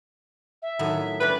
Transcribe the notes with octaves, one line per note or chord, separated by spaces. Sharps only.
E5
A2 D#3 F#3
G3 C#4 B4 D5